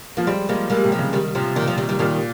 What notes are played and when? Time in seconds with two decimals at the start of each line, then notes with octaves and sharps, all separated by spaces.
0.17 F3 A#3
0.27 G3 G#3 C4
0.49 F3 G#3 A#3
0.70 G3 G#3 A#3
0.85 C3
0.92 F3
0.99 C#3
1.13 D#3 G3
1.35 C3 F3
1.56 A#2 D#3
1.68 F3
1.78 D#3 G3
1.89 D#3 G3
1.99 A#2 D#3 G3